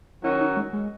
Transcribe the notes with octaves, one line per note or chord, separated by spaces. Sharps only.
D#3 F#3 C#4 E4 F#4
D#4
G#3
G#3